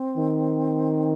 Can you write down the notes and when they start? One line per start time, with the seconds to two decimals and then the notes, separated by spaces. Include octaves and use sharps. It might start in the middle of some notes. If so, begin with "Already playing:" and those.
Already playing: C4
0.18 D#3